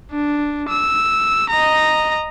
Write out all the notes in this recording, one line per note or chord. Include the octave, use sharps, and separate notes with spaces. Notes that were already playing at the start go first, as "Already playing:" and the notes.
D4
E6
D#5 A#5